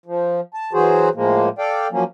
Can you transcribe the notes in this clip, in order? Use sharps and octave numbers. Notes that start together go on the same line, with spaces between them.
F3
A5
E3 F#3 F#4 G#4 C5
A2 F3 G#3 A#3
A4 D5 F5 G5
F3 F#3 A#3 C#4